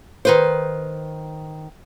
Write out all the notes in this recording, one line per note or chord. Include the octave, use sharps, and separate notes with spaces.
D#3 B4 C5